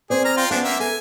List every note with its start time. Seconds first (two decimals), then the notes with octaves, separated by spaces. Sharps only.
0.10 C4 G#4 C5 D5
0.25 A#5 F6
0.37 F4 G5 C6
0.51 F3 B3 C#4 D4 F#5
0.64 A#3 E5
0.80 A4 G#5